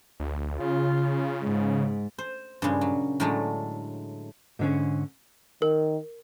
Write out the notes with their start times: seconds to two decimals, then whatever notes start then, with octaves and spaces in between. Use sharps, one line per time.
0.20 D2
0.60 C#3 F4
1.43 G#2
2.18 C5
2.62 G2 A#2 C#3 G#3
2.81 F#3
3.20 A2 D3 F#3 G#3 A3
4.59 G#2 D3 C#4
5.62 D#3 A#4